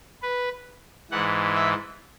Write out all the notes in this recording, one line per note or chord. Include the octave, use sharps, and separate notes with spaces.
B4
G#2 E3 F#5
E5